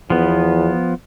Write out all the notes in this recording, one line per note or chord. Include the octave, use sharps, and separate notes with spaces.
E2 F3 B3